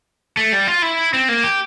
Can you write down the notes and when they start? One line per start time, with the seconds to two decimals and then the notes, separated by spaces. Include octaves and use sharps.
0.37 A3
0.53 G3
0.67 F4
0.82 E4
1.14 C4
1.29 A#3
1.43 G4